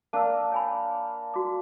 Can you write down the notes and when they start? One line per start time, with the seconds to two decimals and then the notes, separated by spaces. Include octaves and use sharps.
0.13 A#3 D4 A5 E6
0.52 C#5 G#5 B5
1.34 F#4 D6